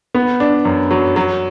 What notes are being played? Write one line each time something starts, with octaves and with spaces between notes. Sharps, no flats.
B3
D4
F#2
F#3
F#3